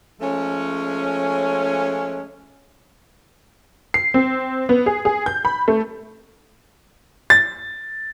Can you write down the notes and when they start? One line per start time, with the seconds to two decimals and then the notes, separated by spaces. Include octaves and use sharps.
0.21 F3 G#3 A3 C#4
3.94 C7
4.14 C4
4.69 B3
4.86 G#4
5.05 G#4
5.26 G6
5.45 B5
5.68 A3
7.30 A6